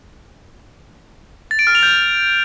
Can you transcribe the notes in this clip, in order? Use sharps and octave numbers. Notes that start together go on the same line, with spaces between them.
A6
D7
F6
F7
G6